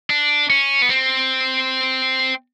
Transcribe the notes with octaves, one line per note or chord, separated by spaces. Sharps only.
D4
C#4
B3
C4